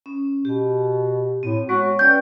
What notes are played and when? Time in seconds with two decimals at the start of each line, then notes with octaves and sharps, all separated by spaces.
0.06 C#4
0.45 B2 G4
1.43 A2 C4
1.69 G#3 B3 F#4 C#5
1.99 C#4 B4 D5 G5 G6